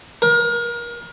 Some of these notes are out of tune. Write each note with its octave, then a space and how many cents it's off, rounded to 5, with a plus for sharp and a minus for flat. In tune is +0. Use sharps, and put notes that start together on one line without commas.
A#4 +30